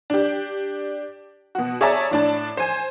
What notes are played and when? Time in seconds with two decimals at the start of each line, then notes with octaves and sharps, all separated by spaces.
0.10 D4 G4
1.55 B2 F#4
1.81 G#4 C#5 D5 E5 A5 A#5
2.11 A2 D4 A5
2.57 C5 G#5